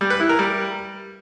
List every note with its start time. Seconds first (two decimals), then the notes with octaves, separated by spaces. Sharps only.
0.01 G3
0.10 B4
0.20 E4
0.29 A#4
0.39 G3